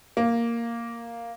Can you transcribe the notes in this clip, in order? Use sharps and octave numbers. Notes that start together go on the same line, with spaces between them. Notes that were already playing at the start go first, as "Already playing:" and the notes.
A#3